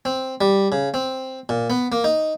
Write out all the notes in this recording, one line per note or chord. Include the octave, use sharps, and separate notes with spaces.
C4
G3
C#3
C4
A#2
B3
A#3
D#4